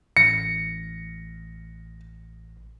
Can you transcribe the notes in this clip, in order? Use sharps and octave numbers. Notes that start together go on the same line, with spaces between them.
A1 A#6 C#7